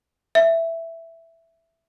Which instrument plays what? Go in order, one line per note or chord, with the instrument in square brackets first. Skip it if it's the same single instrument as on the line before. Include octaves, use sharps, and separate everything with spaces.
[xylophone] E5